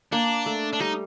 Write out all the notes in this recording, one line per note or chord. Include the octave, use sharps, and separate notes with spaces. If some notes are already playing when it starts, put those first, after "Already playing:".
A#3 D4
A3
D4
G3 D#4